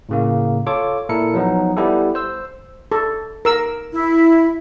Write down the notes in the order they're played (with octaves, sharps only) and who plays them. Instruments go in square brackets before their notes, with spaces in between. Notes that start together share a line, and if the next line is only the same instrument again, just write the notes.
[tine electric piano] A2 C#3 A#3
F4 A4 C#5 D6
A#2 E4 A4 A#4 C#7
F3 F#3 B3 D#4
G3 B3 E4 G4 A4
C5 E6
[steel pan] A4
A#4 E6
[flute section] E4